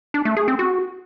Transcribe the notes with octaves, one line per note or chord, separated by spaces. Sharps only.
D4
A3
G#4
C4
F#4